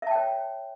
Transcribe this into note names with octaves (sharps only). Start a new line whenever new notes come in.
C#5 E5 G5 A5